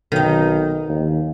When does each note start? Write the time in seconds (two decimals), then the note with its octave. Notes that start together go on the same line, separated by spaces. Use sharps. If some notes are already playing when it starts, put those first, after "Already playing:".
0.12 B1 D#3 D#4
0.89 D#2